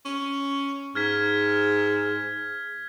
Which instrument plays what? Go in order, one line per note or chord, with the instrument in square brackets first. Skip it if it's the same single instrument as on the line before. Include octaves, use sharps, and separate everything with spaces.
[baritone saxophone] C#4
[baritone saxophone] G#2 [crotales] F6 G#6 B6